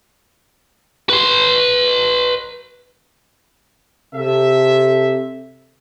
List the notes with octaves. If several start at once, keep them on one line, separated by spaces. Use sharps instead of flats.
B4 C6
C3 A4 E5